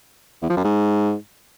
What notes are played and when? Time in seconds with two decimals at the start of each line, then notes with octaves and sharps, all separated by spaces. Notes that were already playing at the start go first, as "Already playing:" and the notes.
0.42 E2
0.49 F3
0.57 F#2
0.64 G#2